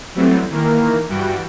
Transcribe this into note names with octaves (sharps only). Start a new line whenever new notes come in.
E3 F#3 G3 A3 B3 C4
D#3 E3 A#3 A#4
G2 E3 G3 F#4 G5 D7